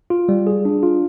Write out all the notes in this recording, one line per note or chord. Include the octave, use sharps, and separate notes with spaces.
F4
G3
G#4
D4
F4